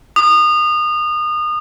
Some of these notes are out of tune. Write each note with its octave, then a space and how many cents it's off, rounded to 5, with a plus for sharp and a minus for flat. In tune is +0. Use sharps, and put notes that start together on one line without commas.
D#6 -30